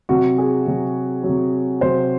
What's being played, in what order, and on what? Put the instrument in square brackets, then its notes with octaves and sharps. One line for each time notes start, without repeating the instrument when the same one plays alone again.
[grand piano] C3 F#3 F#4
G#4
C3 F#3
C3 F#3
C3 F#3 C5